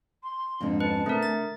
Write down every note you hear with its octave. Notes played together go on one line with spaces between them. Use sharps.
C6
F2 G#2 D3 D4
C#4 B4 A5
D3 A3 C4 A#4
A3 A6